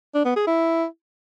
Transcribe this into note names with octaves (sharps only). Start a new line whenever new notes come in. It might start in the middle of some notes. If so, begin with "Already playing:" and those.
D4
B3
G#4
E4